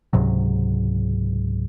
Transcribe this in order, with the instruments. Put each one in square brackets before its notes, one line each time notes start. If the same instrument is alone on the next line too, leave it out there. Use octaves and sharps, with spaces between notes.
[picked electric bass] C#2 G#2 C3 F#3